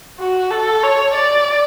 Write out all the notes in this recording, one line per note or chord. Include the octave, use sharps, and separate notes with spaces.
F#4
A4
C#5
D5